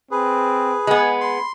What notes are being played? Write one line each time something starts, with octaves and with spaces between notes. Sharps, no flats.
C4 G#4 B4
G#3 B3 G#5
B5 C6